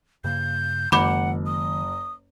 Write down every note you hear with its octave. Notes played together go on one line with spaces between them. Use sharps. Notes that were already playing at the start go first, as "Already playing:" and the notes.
G2 C#3 A#3 G6
F#1 D#3 G#3 F#5 B5 D6 G6
D#6